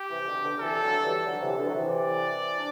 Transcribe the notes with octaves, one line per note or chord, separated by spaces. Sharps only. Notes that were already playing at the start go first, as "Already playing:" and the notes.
Already playing: G4
C3 E3
B2 D3
B2 D3
C3 E3 A4
D3 F#3
E3 G3
D3 F#3
C3 E3
B2 D3
F#3
C3 E3
D5
D4